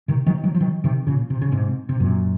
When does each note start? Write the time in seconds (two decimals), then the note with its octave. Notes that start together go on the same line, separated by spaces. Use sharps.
0.08 C3 D#3
0.27 D#3 F#3
0.44 D#3 F#3
0.55 F3
0.61 D#3 F#3
0.84 C3 D#3
1.07 A#2 C#3
1.30 C3
1.42 C#3
1.52 G#2 C3
1.89 C3
2.00 F#2 A#2